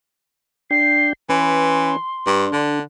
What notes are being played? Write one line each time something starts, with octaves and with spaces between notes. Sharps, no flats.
D4 G5 C7
E3 C#4 B4 C6
G2 D4
D3